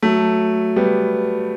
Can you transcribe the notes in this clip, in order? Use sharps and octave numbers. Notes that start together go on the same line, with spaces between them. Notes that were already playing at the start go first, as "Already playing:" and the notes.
F#3 A3
G3 B3